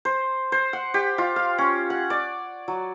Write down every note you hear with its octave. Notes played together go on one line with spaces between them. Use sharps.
C5
C5
F#5
G4
F4
F5
C#4
F#5
D5
F#3